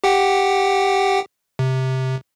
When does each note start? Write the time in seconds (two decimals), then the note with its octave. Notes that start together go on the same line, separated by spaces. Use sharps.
0.04 G4 F#5 G5
1.59 C3